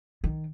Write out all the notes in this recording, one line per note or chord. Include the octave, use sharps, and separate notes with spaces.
D#3